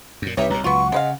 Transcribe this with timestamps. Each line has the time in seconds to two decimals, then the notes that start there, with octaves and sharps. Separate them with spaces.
0.22 F#2 A#2
0.37 C2 D#4 G4 B4 C#5 E5
0.50 C2 A#2 A#5
0.64 C#2 F#3 B3 F4 F#5 C#6
0.92 C#3 G#3 B4 D#5 F5